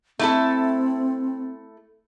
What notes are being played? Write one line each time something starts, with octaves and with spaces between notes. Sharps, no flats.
A3 C4 E4 A4